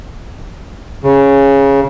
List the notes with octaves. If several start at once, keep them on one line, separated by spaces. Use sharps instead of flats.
C#3